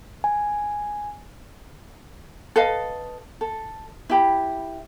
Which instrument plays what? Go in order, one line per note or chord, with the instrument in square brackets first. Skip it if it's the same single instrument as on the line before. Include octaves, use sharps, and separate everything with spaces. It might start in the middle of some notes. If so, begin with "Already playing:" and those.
[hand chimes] G#5
[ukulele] A4 B4 D#5 F5
A4
E4 G4 B5